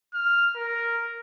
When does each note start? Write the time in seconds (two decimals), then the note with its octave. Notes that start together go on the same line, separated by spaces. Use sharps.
0.14 F6
0.56 A#4